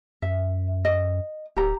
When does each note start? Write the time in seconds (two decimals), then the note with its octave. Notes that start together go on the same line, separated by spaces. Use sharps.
0.22 F#2 E5
0.85 D#5
1.56 D1 G4 A#5